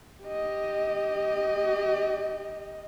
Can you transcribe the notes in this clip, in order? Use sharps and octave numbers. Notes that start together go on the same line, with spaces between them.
G4 D#5